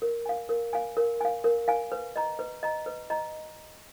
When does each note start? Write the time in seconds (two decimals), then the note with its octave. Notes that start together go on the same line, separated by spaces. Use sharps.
0.02 A#4
0.26 F5 G#5
0.49 A#4
0.73 F5 G#5
0.97 A#4
1.21 F5 G#5
1.44 A#4
1.68 F5 G#5
1.92 B4
2.16 D#5 A#5
2.39 B4
2.63 D#5 A#5
2.86 B4
3.10 D#5 A#5